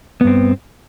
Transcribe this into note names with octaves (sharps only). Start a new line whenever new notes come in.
G2 B3 C4